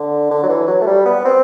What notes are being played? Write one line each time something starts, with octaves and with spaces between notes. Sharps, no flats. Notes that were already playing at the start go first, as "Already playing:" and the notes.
Already playing: D3
D3
F#3
E3
F#3
A3
G3
B3
C4